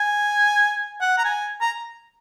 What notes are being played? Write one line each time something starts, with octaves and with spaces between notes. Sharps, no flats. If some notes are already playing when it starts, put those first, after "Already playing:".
Already playing: G#5
F#5
A#5
G#5
A#5